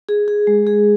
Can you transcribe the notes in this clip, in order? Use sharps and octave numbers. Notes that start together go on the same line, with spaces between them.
G#4
G#4
G#3
G#4